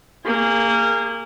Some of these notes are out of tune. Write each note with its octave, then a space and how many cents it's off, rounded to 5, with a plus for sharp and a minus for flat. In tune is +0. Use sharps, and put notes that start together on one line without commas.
A#3 -20 G#4 -30